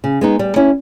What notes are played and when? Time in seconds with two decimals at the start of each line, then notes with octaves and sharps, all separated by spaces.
0.04 C#3
0.21 G#3 B3 D#4
0.39 G3
0.56 C#4 E4